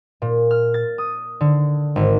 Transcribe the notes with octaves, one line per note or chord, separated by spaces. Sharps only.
A#2
F6
A6
D#6
D3
G#1